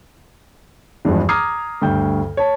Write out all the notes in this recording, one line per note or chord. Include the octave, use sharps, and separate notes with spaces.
E2 G2 F3 G#3
A#5 D6 D#6 F6 G#6 C7
D2 G2 G5 G6
C#5 A5